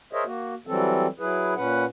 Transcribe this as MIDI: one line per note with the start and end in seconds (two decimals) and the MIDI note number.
0.13 0.24 68
0.13 0.24 70
0.13 0.24 72
0.13 0.24 73
0.13 0.24 75
0.13 0.24 76
0.25 0.54 58
0.25 0.54 66
0.67 1.07 52
0.67 1.07 54
0.67 1.07 55
0.67 1.07 60
0.67 1.07 69
1.19 1.54 54
1.19 1.54 64
1.19 1.54 68
1.19 1.54 71
1.56 1.85 46
1.56 1.85 61
1.56 1.85 71
1.56 1.85 78